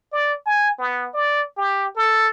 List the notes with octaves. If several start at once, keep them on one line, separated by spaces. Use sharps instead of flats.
D5
G#5
B3
D5
G4
A4